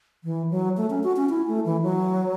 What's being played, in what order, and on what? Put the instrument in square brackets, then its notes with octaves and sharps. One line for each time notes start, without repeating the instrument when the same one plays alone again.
[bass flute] E3
F#3
A3
C#4
F#4
C#4
E4
A3
E3
F#3